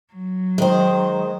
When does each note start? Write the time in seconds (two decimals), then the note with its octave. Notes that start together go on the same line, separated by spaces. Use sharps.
0.13 F#3
0.58 D#3 G#3 C5